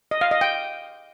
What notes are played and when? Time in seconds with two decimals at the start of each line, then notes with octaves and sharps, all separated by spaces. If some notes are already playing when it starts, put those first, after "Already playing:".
0.11 D#5
0.21 F5
0.31 D#5
0.41 G5